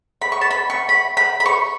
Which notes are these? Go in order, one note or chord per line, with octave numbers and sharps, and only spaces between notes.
B5
C#6
A5
B5
C#6
B5
B5
B5
C#6